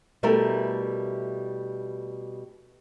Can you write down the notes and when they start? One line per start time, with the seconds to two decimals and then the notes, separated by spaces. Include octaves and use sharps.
0.23 B2 G3 A3 E4 A#4